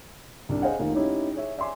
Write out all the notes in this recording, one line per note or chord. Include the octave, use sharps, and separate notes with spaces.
C2 D4
G#4 C5 D#5 F5 F#5 G#5
F1 D#3 A#3 D#4 F4
C#4 D#4 E4 G4 C#5
G#4 C#5 E5
D5 E5 G#5 C6 D6